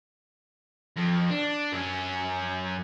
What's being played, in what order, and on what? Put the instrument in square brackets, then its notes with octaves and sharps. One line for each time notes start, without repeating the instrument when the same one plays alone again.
[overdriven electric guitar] F2
D4
F#2 C#4